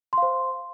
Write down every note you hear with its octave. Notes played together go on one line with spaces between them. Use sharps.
C5 F5 C6